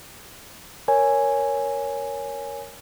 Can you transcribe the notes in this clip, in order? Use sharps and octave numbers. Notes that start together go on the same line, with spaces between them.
A#4 C#5 G#5